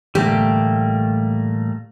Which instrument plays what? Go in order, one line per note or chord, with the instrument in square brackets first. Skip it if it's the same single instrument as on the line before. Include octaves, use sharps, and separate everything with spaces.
[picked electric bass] A2 D3 E3 [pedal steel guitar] G3 A3 A#3 [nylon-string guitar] G4